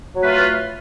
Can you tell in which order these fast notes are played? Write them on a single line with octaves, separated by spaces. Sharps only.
F#3 A3 B4 F4